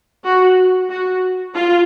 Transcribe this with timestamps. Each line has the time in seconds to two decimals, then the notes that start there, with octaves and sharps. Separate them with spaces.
0.24 F#4
0.89 F#4
1.54 F4